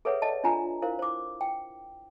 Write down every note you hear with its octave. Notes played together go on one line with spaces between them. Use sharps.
G#4 A4 B4 C#5 E5 F#5
D5 D#5 A5
D4 F4 G#5 A#5
E4 A#4 C5 F5
C5 D6
G5